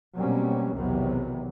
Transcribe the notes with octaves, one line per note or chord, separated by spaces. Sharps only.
B2 F#3 G3 A#3 C4 C#4
B1 E2 C3 D#3 F#3 B3